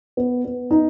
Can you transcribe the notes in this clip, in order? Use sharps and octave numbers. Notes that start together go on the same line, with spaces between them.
B3
B3
D#4